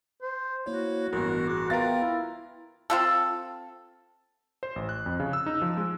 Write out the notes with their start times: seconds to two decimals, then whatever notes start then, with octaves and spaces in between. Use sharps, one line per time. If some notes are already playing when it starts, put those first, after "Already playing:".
0.22 C5
0.66 A#3 E4 F#4 C#5
1.13 A1 G2 B3 A#4
1.47 G#4 D6
1.70 B3 F4 A#4 B4 F5 G5 A6
1.98 E4
2.90 C4 F4 A4
4.63 C5
4.76 A1
4.89 F#6
5.06 F2
5.20 C#3
5.33 E6
5.46 D#4
5.62 F3
5.77 G#3